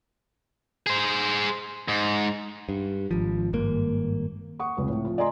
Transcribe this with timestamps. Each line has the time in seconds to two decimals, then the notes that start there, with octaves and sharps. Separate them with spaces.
0.87 G#4 C5
1.88 G#2
2.69 G2
3.11 G#1 F3
3.53 G#1 G2 A#3
4.59 F#5 C#6 D#6
4.77 F1 C#2 B4
4.89 A2
5.05 F3 F4
5.18 D5 D#5 G#5 A#5 C6